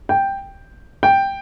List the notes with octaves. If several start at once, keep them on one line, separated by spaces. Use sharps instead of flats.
G5
G5